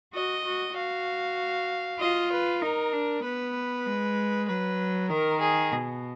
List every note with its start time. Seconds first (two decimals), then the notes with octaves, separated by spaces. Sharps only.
0.14 F#4 D#5
0.46 F#4
0.76 F#4 F5
2.00 F4 D#5
2.31 B4
2.62 D#4 A#4
2.93 D4
3.24 B3 B4
3.86 G#3
4.48 F#3 B4
5.09 D#3 A#4
5.40 G#4
5.72 B2